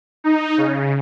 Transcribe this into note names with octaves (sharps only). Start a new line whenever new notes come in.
D#4
C#3